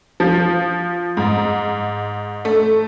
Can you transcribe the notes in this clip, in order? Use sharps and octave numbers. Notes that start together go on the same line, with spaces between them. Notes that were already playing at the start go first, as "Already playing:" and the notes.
F3
G#2
A3